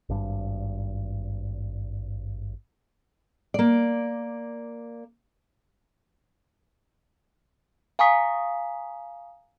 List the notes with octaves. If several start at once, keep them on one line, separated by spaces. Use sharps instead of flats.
G#1 G2
A#3 D5
F5 G#5 A#5 C#6 D#6 B6